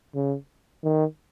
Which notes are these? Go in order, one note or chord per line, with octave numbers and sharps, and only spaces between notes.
C#3
D#3